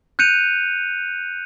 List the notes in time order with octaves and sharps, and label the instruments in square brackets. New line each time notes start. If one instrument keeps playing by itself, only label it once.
[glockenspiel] F#6 G6 C#7 D#7 F7